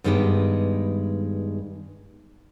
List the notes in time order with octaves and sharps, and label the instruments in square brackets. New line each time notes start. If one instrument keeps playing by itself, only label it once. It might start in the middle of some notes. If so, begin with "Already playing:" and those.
[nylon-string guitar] G2 D#3 G#3 B3 G4 B4